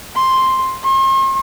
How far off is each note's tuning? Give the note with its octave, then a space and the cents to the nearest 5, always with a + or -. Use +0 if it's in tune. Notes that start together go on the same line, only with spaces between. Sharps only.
C6 +5
C6 +45